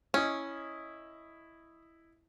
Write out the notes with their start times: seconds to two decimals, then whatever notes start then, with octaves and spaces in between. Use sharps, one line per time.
0.14 C#4 E4 D#5